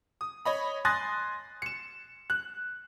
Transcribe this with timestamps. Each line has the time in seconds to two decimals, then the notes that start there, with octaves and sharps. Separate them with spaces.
0.21 D#6
0.45 C#5 D#5 B5
0.85 G#5 C6 D#6 F#6 A6 A#6
1.62 C#7 E7
2.30 F#6